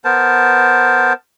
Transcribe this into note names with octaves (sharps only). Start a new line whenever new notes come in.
B3 A#4 C5 A5